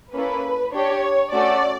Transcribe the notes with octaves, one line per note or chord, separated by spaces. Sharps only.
A#3 C#4 E4 A4 B4
D4 G4 C#5
A3 C#4 F#4 A4 D5